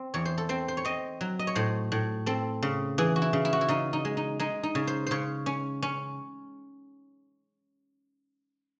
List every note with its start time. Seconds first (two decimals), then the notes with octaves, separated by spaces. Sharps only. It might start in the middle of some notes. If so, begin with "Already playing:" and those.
Already playing: C4
0.14 E2 C#5
0.25 C5
0.38 A4
0.49 C4 C5
0.68 C5
0.77 C#5
0.85 C4 D#5
1.21 F#3
1.39 D#5
1.47 C#5
1.55 A2 C5
1.92 A2
2.26 C4 A4
2.63 C#3
2.98 E3 G#4
3.16 F#4
3.22 E4
3.33 C#3
3.45 E4
3.53 F#4
3.61 E4
3.68 C#3 D#4
3.93 D#4
4.05 G#3
4.17 D#4
4.40 G#3 D#4
4.63 D#4
4.75 C#3
4.87 C5
5.07 C#3 C5 C#5
5.46 C#4
5.82 C#4